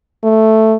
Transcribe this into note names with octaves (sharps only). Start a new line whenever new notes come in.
A3